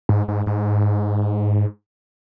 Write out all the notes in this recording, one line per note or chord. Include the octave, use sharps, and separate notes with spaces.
G#2
G#2
G#2